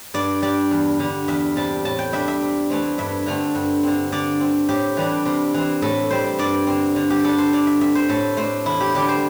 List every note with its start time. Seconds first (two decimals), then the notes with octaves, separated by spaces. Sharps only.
0.14 G2 D5
0.42 G3 D4 D5
0.71 E2
0.99 D3 G3
1.28 E2 E5
1.56 C3 G3 A5
1.85 A2 A5
1.99 G5
2.12 G3 D4 E5
2.28 E5
2.42 C3
2.70 E3 A3 C4
2.98 G2 E5
3.26 D3 A3 C4
3.55 G2
3.83 D3 C4
4.12 D3 D5
4.41 C4
4.69 A2 G4
4.97 E3 G3 D4
5.26 C3
5.54 E3 C4
5.82 A2 A4
6.10 G3 C4 C5
6.38 G2 D5
6.67 D3 C4
6.96 D3
7.10 G4
7.24 G3 D4 A4
7.38 C5
7.52 D3 D5
7.67 E5
7.81 C4 E5
7.95 C5
8.09 A2 A4
8.37 A3 D4 C5
8.66 E2 E4
8.80 G4
8.95 D3 G3 D4 G4
9.09 C5